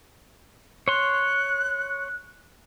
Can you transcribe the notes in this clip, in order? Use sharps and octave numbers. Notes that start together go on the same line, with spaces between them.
C#5 C6 F#6